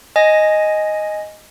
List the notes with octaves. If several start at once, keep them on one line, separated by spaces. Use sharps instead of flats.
D#5 G#5 A#6